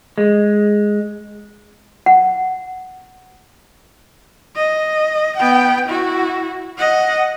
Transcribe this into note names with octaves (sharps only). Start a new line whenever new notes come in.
G#3
F#5
D#5
B3 G5
E4 F#4
D#5 F#5